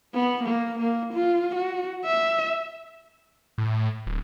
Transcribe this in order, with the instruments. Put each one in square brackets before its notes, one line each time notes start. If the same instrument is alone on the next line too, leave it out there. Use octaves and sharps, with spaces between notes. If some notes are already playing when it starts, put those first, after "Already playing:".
[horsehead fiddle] B3
A#3
A#3
F4
F#4
E5
[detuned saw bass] A2
D1